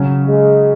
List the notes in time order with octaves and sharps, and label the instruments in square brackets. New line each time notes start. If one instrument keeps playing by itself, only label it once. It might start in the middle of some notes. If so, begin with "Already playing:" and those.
Already playing: [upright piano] C#3 F#3 C#4
[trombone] G#3